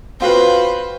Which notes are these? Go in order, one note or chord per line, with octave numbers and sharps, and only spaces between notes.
C4 F4 F#4 B4 C5